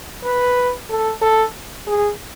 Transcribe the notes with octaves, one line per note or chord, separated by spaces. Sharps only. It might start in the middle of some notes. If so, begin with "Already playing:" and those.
B4
A4
A4
G#4